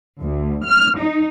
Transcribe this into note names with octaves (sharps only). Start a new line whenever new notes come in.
D2
F6
D#4